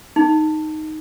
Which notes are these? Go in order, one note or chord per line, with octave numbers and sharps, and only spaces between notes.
D#4